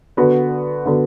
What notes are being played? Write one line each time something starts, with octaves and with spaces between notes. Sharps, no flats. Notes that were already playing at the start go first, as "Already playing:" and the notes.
D3 B3 F#4 B4
D3 B3 F#4 B4